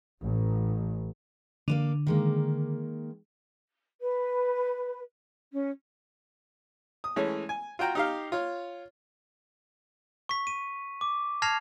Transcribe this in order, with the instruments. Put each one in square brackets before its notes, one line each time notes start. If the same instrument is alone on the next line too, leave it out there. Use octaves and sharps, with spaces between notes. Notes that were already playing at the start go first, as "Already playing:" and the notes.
[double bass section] A1
[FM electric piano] D3 [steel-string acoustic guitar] A#3 C4 D4
[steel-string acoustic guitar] D#3 G#3 A#3
[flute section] B4
C#4
[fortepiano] D#6
E3 G#3 A3 C#4
G#5
F4 F#4 G5 A#5
D#4 G4 F5
F4 C#5
[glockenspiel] C#6 B6
D#7
D6
A5 F6 G#6 A#6 C7 F7